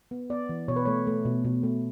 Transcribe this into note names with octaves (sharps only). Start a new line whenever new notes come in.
B3
B3 D5
E3
B2 C#5
B4
A3 C#5
A3
B2
B2
A3